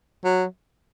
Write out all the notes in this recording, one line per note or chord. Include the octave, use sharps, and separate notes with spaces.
F#3